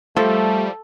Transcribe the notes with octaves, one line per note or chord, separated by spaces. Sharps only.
F3 G3 A3 A4